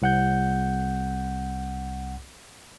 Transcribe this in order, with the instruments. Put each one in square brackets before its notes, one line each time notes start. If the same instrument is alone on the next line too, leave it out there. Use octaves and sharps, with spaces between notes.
[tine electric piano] C2 F#5 G6